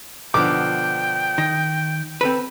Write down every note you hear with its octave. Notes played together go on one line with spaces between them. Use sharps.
B2 D3 F3 G5 D6
D#3 A#6
C4 A4 B4